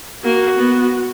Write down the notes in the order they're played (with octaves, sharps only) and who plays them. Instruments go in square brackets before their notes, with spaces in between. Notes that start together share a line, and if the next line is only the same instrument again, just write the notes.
[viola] A#3 [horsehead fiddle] F#4
[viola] B3